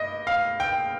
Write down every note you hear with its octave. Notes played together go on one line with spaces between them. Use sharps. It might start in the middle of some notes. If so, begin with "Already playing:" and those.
Already playing: G2 D#5
F5
G5